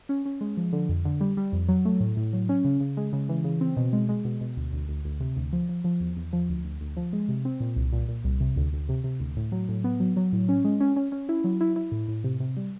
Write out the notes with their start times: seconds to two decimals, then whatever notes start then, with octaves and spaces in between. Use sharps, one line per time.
0.09 C#4
0.26 C#4
0.41 G#3
0.57 F3
0.73 D3
0.89 F2
1.05 D3
1.21 G3
1.37 G3
1.53 F2
1.68 F#3
1.85 A3
2.00 A2
2.17 A2
2.33 F#3
2.49 C#4
2.65 C#3
2.81 C#3
2.97 G#3
3.13 C#3
3.29 E3
3.44 C#3
3.61 C4
3.77 B2
3.93 G#3
4.09 G#3
4.25 B2
4.41 B2
4.57 D2
4.73 D2
4.89 D2
5.05 D2
5.20 C3
5.37 D2
5.53 F3
5.69 F3
5.84 F3
6.00 E2
6.16 E2
6.33 F3
6.49 D2
6.65 D2
6.81 D2
6.97 F3
7.13 G#3
7.29 C3
7.45 C4
7.60 A#2
7.76 C2
7.93 A#2
8.08 A#2
8.24 C2
8.40 C3
8.56 D2
8.73 D2
8.89 C3
9.04 C3
9.20 D2
9.36 A2
9.52 F#3
9.69 A2
9.84 B3
10.00 F#3
10.17 F#3
10.33 A2
10.49 C#4
10.64 G#3
10.80 C#4
10.96 C#4
11.12 C#4
11.29 E4
11.44 F#3
11.61 E4
11.76 E4
11.92 A2
12.08 A2
12.24 C3
12.40 C3
12.56 G3